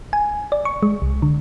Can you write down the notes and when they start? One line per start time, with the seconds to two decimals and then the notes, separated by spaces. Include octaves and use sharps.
0.13 G#5
0.52 D5
0.65 C#6
0.83 G#3
1.02 C2
1.22 D3